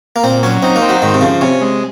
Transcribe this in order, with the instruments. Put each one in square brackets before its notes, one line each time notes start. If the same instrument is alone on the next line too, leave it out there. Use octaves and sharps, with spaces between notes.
[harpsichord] A#3
[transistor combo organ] A#2 [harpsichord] C4
[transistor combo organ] F#3 [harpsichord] C#4
[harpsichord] C4 [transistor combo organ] D#4
[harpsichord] A#3
[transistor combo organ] C4
[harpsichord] F#3
[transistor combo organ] G#2 [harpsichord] D#3
[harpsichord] C3
[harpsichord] C#3 [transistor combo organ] F3
[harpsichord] C3 [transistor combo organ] C#4
[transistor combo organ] G#3